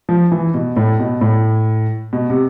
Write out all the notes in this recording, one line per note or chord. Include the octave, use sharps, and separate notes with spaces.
F3
E3
B2
A2
B2
A2
B2
C3